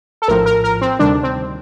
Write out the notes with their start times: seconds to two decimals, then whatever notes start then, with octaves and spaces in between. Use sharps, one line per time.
0.22 A4
0.28 A#1 A2 F3 A#4
0.46 A#4
0.64 A#4
0.81 C4
0.99 D2 C3 D#3 G3 D4
1.23 C4